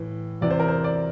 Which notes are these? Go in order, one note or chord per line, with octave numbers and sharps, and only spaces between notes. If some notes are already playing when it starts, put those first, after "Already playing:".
Already playing: A2 E3
E2 C3 E3 D5
C5
A#4
C5
D5